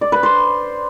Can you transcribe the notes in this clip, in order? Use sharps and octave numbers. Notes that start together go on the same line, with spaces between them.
D5
B4
C5